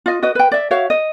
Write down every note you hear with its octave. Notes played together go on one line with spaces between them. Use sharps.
F4 D#5
F#4 B4 D#5
B4 G5
D5 E5
F#4 C#5 E5 F5
D#5